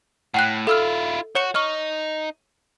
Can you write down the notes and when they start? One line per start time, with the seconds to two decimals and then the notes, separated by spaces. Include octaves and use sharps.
0.34 A2 F#5 G5 F#6
0.67 E4 F4 A4 E6 F6
1.35 F#4 C#5 C#7 E7
1.55 D#4 C#6 F6